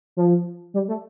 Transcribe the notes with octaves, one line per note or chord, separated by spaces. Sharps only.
F3
G3
A3